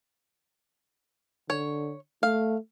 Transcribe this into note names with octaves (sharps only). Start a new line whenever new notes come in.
D3 C#5
A3 F5